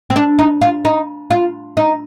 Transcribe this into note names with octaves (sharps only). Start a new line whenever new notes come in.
C4
D4
D#4
F4
D#4
F4
D#4